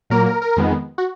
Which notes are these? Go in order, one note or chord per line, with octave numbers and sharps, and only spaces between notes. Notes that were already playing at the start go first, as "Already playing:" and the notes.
A#2 F#3 A#3 A#4
A#4
A#4
F2 D#3 G#3 B3
F#4